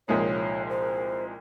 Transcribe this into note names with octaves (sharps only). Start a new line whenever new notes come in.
C2 A#2 F3 G#3 D#4 C#5
C5